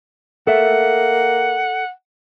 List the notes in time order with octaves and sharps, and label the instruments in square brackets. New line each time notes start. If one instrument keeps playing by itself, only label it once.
[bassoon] A#3 [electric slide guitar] A4 E5 [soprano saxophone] F#5